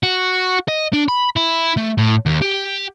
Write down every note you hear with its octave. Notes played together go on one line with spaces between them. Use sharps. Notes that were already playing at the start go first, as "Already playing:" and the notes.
F#4
D#5
D4
B5
E4
A3
A2
D#2
G4